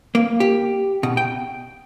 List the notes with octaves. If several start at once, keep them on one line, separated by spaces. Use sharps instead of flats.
A#3
G4
B2
G5